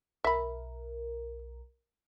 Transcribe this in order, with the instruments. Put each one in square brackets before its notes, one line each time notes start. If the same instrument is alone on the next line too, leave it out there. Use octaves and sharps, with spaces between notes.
[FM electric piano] B1 A#4 [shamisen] E5 B5